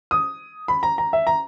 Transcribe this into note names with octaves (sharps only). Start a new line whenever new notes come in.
D#6
B5
A#5
A#5
E5
A#5